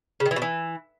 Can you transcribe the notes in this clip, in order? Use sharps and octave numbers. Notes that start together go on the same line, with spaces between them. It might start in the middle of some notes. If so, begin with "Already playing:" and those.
C#3
D#3
E3
B2
E3